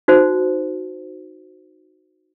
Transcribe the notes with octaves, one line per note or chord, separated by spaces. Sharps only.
D#4 F#4 C5